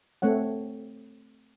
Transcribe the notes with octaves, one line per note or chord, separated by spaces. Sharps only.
A3 C4 C#5 F#5